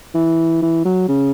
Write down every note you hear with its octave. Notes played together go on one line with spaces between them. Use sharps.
E3
E3
F#3
C#3